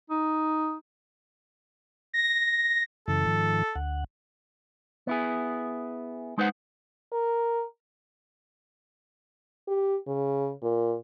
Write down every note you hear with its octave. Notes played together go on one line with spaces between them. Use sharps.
D#4
A#6
F#2 C#3 E3 A4
G#2 D#3 F3
D2 F#5
B3 E4 G#4
G#3 D#4 B4 C5 F#5
A#4
G4
C#3
A#2